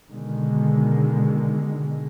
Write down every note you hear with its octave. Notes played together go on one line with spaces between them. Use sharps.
B2 D3 D#3 G#3